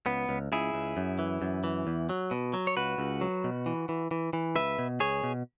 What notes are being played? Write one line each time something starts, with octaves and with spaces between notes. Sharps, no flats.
C#2 B3
C#2
C#2 E4 G#4
C#2
F#2
E3
F#2
E3
E2
F#3
B2
F#3
C#5
C#2 F#4 B4
C#2
F#3
B2
E3
E3
E3
E3
C#2 B4 E5
B2
C#2 G#4 C#5
B2